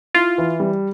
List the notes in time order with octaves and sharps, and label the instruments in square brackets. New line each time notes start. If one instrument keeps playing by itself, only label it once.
[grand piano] E4 [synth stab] F4
[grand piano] E3
G3